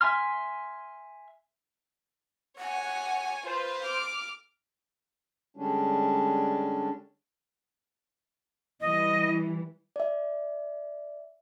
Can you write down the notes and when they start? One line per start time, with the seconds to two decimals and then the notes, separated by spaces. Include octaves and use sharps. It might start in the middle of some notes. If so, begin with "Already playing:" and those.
0.01 E5 G#5 C6 F6
2.58 C#5 F#5 G#5
3.46 F4 B4 C5 C6
3.84 D6 F6
5.57 D3 G3 G#3 C#4 D4
8.81 E3 G3 D#5
9.96 D5 E5